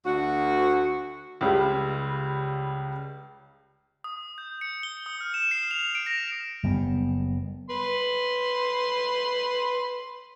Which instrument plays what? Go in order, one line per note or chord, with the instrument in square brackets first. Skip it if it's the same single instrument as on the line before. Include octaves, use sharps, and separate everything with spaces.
[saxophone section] D2 F#4
[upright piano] C#2 C#3 G3
[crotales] D#6
G6
C#7
G7
D#6
F6
E7
C7
F7
D7
A#6
[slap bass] F#1 G3 B3
[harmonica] B4 C6